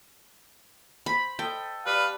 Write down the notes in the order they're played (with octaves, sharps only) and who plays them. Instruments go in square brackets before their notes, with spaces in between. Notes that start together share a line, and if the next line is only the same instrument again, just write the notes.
[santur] C5 [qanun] B5
[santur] A4 D#5 [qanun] G5
[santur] G3 B3 [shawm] B4 [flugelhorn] F5